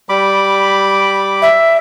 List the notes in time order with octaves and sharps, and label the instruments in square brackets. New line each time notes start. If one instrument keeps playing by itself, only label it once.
[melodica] G3 B5 D6
[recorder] E5